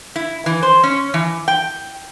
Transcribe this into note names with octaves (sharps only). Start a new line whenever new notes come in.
E4
E3
C5
C#4
E3
G5